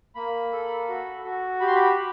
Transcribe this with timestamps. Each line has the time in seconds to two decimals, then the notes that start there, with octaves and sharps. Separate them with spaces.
0.15 A#3 B5
0.52 A4
0.89 F#4
1.24 F#4
1.60 G4 B5
1.67 C6
1.75 B5
1.97 G4